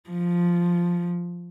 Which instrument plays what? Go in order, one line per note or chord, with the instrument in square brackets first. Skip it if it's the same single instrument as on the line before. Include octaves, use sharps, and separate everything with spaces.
[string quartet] F3